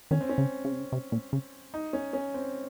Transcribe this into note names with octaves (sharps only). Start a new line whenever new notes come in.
D#3 C#4
C4
C#4
C#3
C#3
C3
C#3
C3
A#2
C#3
D#4
C#4
C#4
C4